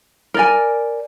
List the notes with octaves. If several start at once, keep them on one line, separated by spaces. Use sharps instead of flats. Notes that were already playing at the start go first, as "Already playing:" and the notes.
A#4 D5 G#5